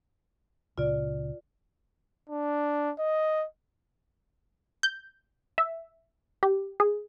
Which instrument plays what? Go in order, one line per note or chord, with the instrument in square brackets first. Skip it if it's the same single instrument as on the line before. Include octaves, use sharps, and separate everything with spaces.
[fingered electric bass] C#2 A#2 C#3 [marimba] F4 D5
[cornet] D4
D#5
[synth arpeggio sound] G6
E5
G4
G#4